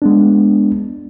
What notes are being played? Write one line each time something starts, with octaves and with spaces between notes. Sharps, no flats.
G#3 B3 D4